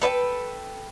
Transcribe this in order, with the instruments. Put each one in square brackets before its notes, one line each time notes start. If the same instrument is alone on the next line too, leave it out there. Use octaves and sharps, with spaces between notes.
[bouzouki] A4 B4 D#5 G5